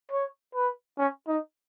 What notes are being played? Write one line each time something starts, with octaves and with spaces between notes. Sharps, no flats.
C#5
B4
C#4
D#4